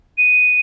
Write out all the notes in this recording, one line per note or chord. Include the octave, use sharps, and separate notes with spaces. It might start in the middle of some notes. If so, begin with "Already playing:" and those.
D#7